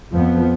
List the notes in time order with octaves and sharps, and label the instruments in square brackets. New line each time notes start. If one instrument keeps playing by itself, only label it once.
[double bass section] F2 F3 B3